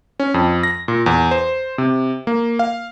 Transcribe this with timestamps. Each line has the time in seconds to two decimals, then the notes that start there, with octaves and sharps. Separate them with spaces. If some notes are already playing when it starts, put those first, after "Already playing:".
0.20 C#4
0.34 F2
0.63 A#6
0.88 A#2
1.06 E2
1.31 C5
1.78 C3
2.27 A#3
2.59 F5